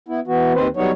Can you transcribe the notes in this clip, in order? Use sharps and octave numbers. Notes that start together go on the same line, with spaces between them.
B3 E4
E3 B3 F#4
D#2 D#3 C4 B4 C5
F#3 G3 B3 D#4 C#5